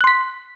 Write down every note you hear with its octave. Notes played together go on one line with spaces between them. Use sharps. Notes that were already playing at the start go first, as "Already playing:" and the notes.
C6 F#6 B6